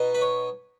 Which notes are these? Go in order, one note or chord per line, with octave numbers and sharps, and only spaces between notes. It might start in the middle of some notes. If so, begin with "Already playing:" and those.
Already playing: B2 B3 D#4
B4
C#5